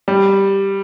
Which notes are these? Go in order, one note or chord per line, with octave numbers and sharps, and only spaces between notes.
G3